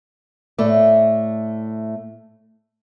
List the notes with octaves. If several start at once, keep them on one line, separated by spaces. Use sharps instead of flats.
A2 A3 D5